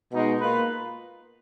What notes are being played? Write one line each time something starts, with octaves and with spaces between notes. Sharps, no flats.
B2 G#3 D#4
A#3 F4 B4